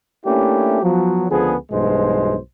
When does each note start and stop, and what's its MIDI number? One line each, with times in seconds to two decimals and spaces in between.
0.25 0.81 57
0.25 0.81 58
0.25 0.81 61
0.25 0.81 62
0.25 0.81 64
0.25 0.81 67
0.82 1.26 53
0.82 1.26 54
0.82 1.26 59
1.30 1.55 37
1.30 1.55 50
1.30 1.55 53
1.30 1.55 59
1.30 1.55 68
1.71 2.36 35
1.71 2.36 43
1.71 2.36 47
1.71 2.36 52
1.71 2.36 56
1.71 2.36 72